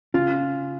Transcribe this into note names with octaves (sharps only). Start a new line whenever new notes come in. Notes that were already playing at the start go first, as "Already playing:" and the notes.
C#3 F4